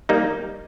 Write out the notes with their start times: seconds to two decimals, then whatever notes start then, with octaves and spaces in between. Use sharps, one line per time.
0.09 G3 A#3 D#4